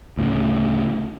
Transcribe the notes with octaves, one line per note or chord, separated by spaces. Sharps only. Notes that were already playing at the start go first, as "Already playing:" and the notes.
D2 A2 C#3